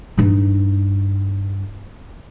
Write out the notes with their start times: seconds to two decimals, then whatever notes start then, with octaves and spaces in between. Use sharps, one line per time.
0.18 G2 D#4